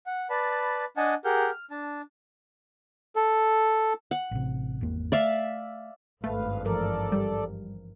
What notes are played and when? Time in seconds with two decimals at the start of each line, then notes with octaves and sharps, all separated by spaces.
0.06 F#5
0.30 B4 D5 A5 B5
0.97 D4 D#5 F#5 G#5 A5
1.25 G4 G#4 A#4 F#5 F6 G6
1.51 F6
1.71 D4 A5
3.16 A4
4.11 F#5
4.31 A1 C3
4.81 G#1 E2 A#3
5.12 A3 D5 E5 F5
6.24 G#1 G2 A3 B4 F5
6.65 E3 F3 A4 A#4 D5
7.12 G3